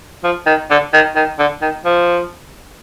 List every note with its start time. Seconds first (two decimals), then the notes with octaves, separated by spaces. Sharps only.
0.24 F3
0.47 D#3
0.70 D3
0.93 D#3
1.16 D#3
1.39 D3
1.62 D#3
1.85 F3